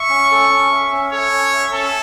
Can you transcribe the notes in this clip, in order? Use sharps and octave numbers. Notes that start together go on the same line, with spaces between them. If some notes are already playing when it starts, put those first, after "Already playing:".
Already playing: E5 C#6
C#4
A4
C#4
E5
C#4
A4 C#5
C#4
E5
C#4 A4